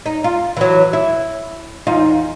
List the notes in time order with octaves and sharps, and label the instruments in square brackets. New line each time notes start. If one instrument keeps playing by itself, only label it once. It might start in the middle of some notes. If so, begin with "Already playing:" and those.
[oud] D#4
F4
E3 F#3
E4
E2 D#4 F4